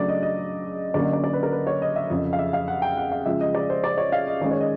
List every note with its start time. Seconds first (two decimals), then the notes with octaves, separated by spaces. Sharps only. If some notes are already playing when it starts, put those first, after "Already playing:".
Already playing: C#3 F#3 A3 D4 D5
0.08 D#5
0.23 D#5
0.94 D3 F#3 A#3 C#4 D5
1.04 D#5
1.13 D5
1.24 D5
1.33 B4
1.43 A#4
1.52 B4
1.67 C#5
1.82 D#5
1.96 E5
2.10 F2 C#3 F3
2.33 F5
2.39 E5
2.53 F5
2.68 F#5
2.82 G5
2.97 F#5
3.12 F5
3.26 C#3 F3 G#3 E5
3.41 D#5
3.55 D5
3.70 C5
3.84 D5
3.98 C#5
4.12 F5
4.27 D#5
4.41 D#3 G#3 C#4 D5
4.51 C#5
4.61 D#5